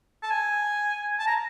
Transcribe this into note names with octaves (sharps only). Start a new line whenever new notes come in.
A5
G#5
A5
A#5